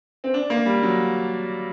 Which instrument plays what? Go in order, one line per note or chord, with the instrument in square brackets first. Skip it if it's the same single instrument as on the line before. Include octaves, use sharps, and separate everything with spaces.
[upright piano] C4
D4
A#3
G3
F#3